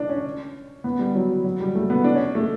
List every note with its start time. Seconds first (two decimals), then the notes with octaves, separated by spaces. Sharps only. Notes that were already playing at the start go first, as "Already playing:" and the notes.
Already playing: D4
0.09 C#4
0.84 B3
0.99 G3
1.15 F#3
1.44 F#3
1.60 G3
1.75 A3
1.90 B3
2.04 D4
2.15 C#4
2.35 A3